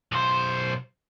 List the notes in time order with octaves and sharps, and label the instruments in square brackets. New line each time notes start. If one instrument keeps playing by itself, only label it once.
[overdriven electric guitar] B1 C5